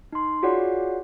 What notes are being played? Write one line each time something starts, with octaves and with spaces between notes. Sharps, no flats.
D#4 C6
F4 F#4 G#4 C#5 D5 F#5